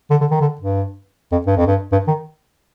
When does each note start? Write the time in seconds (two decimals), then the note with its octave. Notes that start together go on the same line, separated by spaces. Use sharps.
0.10 D3
0.21 D3
0.31 D#3
0.41 D3
0.61 G2
1.32 F2
1.47 G2
1.57 F2
1.67 G2
1.92 G2
2.07 D#3